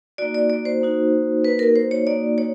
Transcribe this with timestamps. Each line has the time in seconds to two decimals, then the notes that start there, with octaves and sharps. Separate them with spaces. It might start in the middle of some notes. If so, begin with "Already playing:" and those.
0.18 A#3 D#4 F#4 D5
0.35 D5
0.50 D5
0.65 C5
0.81 A#3 D#4 F#4
1.44 A#3 D#4 F#4 B4
1.59 A#4
1.76 C5
1.91 C#5
2.07 A#3 D#4 F#4 D5
2.38 C#5